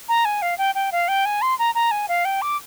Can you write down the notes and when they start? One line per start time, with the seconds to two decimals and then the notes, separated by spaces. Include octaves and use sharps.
0.09 A#5
0.25 G#5
0.42 F5
0.58 G5
0.75 G5
0.92 F5
1.08 G5
1.25 G#5
1.42 C6
1.59 A#5
1.75 A#5
1.91 G#5
2.08 F5
2.25 G5
2.42 D6